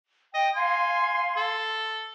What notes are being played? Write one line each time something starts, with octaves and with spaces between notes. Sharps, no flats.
D#5 G5
F5 G#5 C6
A4